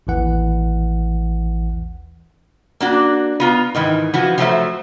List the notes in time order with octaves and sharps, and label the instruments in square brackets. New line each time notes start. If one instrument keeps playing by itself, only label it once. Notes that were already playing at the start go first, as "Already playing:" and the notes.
[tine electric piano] A1 D#2 E3 F#5
[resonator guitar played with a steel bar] A#3 D4 F#4
B3 F4 A#5
G#2 D#3 E3
E3 F3 F#4
F3 F#3 A3 A#4 C5 E5